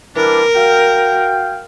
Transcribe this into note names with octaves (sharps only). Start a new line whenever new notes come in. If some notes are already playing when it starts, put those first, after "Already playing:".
E3 G3 D4 A#4
F#4 F5 G5